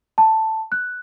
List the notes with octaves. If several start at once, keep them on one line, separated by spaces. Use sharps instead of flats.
A5
F#6